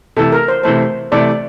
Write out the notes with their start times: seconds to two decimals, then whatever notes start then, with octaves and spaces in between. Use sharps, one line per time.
0.17 C3 E3 A3 A4
0.32 A#4
0.48 C5
0.63 C3 E3 A3 C5
1.12 C3 E3 A3 D5